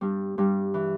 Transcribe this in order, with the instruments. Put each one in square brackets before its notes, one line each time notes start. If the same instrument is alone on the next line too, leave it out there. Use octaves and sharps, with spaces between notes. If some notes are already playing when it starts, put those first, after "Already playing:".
[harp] G2 G3
G2 G3
E3